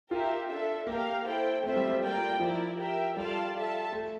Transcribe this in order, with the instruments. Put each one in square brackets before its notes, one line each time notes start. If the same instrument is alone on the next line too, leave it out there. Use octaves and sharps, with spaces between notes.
[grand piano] F4 [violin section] G4 A#4 E5
[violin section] D4 A4 E5
[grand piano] A#3 [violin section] G4 A#4 F5
[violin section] E4 A4 C5 G5
[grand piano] A3 [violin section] C4 F4 C5 E5
[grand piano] G3
G3
[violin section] A#3 F4 A#4 D5 G5
[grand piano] F3 [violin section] E4 A#4 D5
[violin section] G4 A#4 E5 G5
[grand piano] G3 [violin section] F4 A4 D5 F5 A5
[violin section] F4 A4 E5 A5
[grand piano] A3